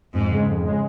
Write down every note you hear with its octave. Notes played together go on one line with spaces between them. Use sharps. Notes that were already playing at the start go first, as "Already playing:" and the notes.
F2 G#2
C#3 G#3
F2
C#3 G#3